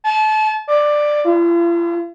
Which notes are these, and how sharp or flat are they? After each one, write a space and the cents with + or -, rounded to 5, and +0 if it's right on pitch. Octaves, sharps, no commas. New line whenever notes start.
A5 -30
D5 +10
F4 -45